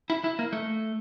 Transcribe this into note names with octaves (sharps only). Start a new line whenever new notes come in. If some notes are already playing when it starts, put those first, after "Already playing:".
E4
E4
A#3
A3